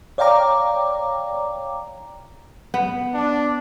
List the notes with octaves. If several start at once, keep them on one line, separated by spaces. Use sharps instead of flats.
C#5 D5 F5 G5 A#5 D6
B3
D4